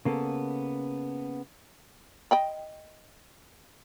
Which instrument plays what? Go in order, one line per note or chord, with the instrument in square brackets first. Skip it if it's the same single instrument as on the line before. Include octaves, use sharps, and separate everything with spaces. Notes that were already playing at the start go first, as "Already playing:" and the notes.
[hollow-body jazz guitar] C#3 A#3 B3 A4
[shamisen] D#5 G5 B5